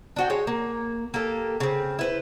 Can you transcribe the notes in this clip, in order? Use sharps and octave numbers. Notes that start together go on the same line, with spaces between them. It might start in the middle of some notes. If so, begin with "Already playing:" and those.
D4 F#4 G5
G#3 C#5
A#3
A#3 G4 A4
C#3 C4
E4 B4 C5